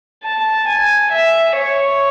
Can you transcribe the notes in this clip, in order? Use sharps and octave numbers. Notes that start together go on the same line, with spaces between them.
A5
G#5
E5
C#5